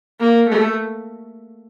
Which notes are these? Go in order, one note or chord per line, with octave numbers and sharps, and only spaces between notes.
A#3
A3